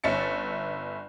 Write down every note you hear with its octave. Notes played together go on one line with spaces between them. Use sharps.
G1 C#4 E5 A6 C#7